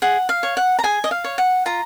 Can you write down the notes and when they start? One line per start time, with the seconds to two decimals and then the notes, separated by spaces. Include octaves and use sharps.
0.02 G#4 F#5
0.29 F5
0.43 C#5
0.57 F#5
0.79 A#5
0.83 G#4 G#5
1.04 D#5
1.11 F5
1.24 C#5
1.38 F#5
1.66 F4 A#5